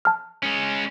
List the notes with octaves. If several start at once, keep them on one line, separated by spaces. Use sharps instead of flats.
A5 F6
G#3 C#4